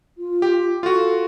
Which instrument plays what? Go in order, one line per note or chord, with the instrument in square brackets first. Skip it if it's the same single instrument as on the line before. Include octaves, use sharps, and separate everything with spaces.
[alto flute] F4
[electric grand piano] G4
[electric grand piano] F4 F#4 [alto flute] A4